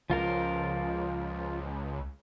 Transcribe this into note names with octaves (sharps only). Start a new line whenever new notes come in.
C#2 F3 F4 A#4